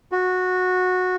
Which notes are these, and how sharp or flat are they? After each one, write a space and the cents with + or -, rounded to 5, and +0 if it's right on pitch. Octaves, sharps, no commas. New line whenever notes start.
F#4 -15